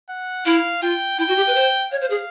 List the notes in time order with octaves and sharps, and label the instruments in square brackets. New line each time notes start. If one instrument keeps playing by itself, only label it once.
[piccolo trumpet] F#5
[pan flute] E4 [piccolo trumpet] F5
[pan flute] F4 [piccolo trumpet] G5
[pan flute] E4 [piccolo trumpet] G5
[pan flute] F#4
G4
B4
C5
[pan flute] C#5 [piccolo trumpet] F5
[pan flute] C5
G#4